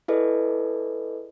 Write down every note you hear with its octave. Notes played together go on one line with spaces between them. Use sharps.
E4 G#4 A4 B4 D5 D#5